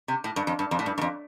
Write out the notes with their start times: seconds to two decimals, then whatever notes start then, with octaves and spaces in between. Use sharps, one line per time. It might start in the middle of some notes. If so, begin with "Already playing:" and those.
0.08 C3
0.24 A2
0.36 G2
0.47 F2
0.59 G2
0.71 F2
0.79 A2
0.86 G2
0.98 G2
1.01 F2